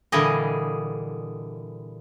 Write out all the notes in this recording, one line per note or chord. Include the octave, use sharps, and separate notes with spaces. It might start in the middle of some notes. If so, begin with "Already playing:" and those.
A#2 D3 E3 G3 G#4 D#5